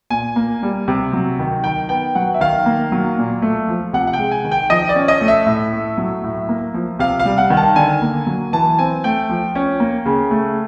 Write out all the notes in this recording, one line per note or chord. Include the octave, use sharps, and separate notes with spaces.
A#2 G#5
A#3
G3
C3
F#3
D#3
D#3 G5
B3 G5
F#3 F#5
E5
D#3 F5
A#3
F#3
A#2
A3
F3
C3 F#5
F#5
G5
G#3
G#5
D#3
G5
F3 D#5
D5
C#4
D#5
A3
E5
A2
A3
F#3
A2
A#3
F3
C3 F5
F5
G3
F#5
D#3
A5
D3 G#5
A#3
F#3
E3 A5
C4 G#5
A3 G5
F3
C#4
A#3
C#3
A3